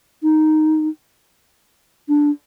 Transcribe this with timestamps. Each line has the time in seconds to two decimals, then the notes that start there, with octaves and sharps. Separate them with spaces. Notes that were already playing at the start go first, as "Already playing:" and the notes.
0.23 D#4
2.09 D4